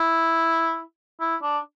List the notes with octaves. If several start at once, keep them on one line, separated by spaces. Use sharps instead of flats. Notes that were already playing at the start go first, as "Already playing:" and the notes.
Already playing: E4
E4
D4